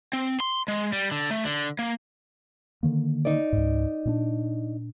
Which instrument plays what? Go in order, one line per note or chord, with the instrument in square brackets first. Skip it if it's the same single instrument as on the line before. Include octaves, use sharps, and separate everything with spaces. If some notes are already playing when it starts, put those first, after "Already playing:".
[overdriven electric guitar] C4
C6
G#3
G3
D3
A3
D3
A#3
[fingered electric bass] D3 D#3 A#3
[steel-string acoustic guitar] D#4 D5
[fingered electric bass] C#2 G#2
A#2 C4 D4